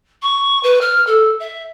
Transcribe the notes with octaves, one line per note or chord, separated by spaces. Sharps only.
C#6
B4
F6
A4
E5